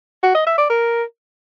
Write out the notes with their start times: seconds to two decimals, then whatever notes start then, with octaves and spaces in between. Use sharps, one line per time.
0.23 F#4
0.35 D#5
0.46 E5
0.58 D5
0.70 A#4